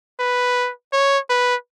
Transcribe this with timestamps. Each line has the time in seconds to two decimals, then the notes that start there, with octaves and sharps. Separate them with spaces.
0.19 B4
0.93 C#5
1.29 B4